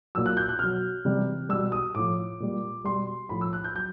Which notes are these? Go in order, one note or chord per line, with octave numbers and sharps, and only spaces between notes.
A#2 F#3 E6
F#6
G6
F#6
B2 F#3 F6
C3 E3 G3
B2 G3 E6
D#6
A2 F3 D6
A#2 G3
B2 G3 C6
A2 F3 B5
E6
F#6
G6
F#3 G6